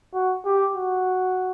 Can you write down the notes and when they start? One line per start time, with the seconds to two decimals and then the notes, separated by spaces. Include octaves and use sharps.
0.14 F#4
0.45 G4
0.75 F#4